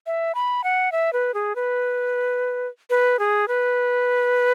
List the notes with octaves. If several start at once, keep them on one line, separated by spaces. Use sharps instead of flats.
E5
B5
F#5
E5
B4
G#4
B4
B4
G#4
B4